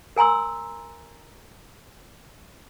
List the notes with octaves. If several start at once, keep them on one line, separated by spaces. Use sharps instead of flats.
A#4 G#5 A#5 C6 E6